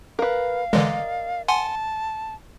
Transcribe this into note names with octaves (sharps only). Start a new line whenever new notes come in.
A#4 B4 F5
D3 E3 G#3 A#4 D5 D#5
F#5 G#5 A5 C6